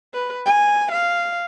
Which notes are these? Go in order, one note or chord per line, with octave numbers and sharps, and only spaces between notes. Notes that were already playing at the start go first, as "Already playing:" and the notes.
B4
G#5
F5